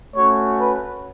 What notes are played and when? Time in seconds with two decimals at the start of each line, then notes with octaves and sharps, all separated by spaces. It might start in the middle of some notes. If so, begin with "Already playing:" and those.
0.14 A3 C#4 F#4 C#5
0.59 B4